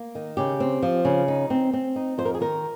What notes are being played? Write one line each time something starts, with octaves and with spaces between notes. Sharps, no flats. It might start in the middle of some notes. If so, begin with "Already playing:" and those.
Already playing: A#3
D#3
C#3 G4
C4
F3
C#3
D#4
C4
C4
D#4
F2 C5
A#4
G#4
D#3 A#4